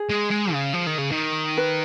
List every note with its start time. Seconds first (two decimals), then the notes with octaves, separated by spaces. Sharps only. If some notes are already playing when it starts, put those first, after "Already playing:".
Already playing: G#4
0.10 G#3
0.30 G#3
0.53 C#3
0.73 F3
0.87 D#3
0.98 C#3
1.11 D#3
1.58 B4